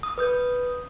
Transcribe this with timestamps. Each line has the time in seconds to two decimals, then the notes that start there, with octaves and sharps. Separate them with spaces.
0.03 D#6
0.18 B4 D#6 G6